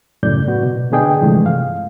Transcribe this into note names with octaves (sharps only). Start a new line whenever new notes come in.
F#2 A2 C#3 D5 G6
B3 F#4
B2
D3 B3 D4 G#4 D#5 G5
G2 C3 E3 F3 G#3 A3
F5